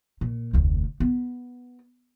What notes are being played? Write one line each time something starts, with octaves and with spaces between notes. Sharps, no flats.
A#2
F1 D2
B3